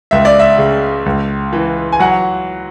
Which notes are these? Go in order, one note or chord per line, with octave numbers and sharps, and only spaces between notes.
C#2 E5
D5
E5
C#3
C#2
E3
G#5
F#3 F#5